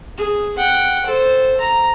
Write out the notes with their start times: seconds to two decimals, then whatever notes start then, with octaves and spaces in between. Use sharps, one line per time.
0.17 G#4
0.58 F#5 G5
1.06 A4 C5
1.60 A#5